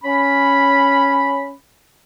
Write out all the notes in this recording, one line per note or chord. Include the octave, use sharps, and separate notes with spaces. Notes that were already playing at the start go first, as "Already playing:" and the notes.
C#4 B5